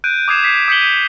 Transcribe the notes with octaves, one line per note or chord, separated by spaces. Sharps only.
F#6 G6 D7 D#7
D6 D#6 G#6 C7 E7
B6 C7
D#6 G6 B6 C#7 F#7 G7
D#7